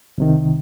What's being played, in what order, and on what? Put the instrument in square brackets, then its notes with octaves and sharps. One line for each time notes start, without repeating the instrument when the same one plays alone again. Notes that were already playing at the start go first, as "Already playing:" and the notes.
[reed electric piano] C2 C3 D#3